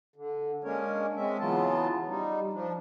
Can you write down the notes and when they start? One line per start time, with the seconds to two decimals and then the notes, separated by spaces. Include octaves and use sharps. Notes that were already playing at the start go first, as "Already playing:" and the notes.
0.16 D3
0.64 G#3 A#3 C#4 D4 A#4 C#5
1.16 G#3 C4 C#4 E5
1.40 C#3 E3 F#3 B3 F4 A5
2.08 G3 D#4
2.53 F3 D4